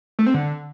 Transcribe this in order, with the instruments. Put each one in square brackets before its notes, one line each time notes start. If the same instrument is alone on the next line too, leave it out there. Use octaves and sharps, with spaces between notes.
[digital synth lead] A3
C4
D3